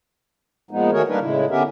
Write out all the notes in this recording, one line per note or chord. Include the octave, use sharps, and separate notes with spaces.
A#2 F3 G#3 B3 D#4
D#3 A3 F#4 G#4 A#4 C#5
G3 A#3 D4 D#4 A#4 B4
A2 C#3 G#3 E4
D3 B3 C#4 G4 A#4 E5